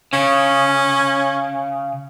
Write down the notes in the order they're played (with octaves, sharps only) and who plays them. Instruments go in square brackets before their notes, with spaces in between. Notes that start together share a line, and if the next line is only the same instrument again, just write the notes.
[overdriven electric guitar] C#3 [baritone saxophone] C#4